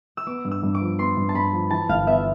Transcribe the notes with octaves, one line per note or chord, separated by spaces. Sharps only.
E6
B3 D6
G2
E6
G2
D6
F3
B3 C6
G2
A5
G2 B5
F3
E3 A5
G1 F5
B3 E5